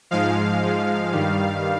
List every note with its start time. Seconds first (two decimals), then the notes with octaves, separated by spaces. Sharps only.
0.11 G#2 F3 G#3 F5
0.61 G#2 F3 G#3
1.12 G2 D#3 G3